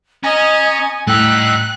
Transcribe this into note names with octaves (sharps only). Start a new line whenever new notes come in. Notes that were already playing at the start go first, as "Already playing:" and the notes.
C#4 D#5 G#5 A#5
A2 G3 D#4 G5 E6 F#6